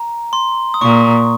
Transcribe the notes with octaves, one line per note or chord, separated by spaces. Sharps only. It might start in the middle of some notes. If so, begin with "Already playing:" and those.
Already playing: A#5
C6
D#6
A#2 C#6